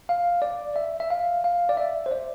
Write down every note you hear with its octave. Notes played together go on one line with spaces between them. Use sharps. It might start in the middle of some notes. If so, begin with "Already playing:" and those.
F5
D5
E5
E5
F5
F5
D5
E5
C5
D5